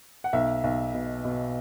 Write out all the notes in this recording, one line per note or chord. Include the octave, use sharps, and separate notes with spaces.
F#5
B1 E5
B1
B2
B2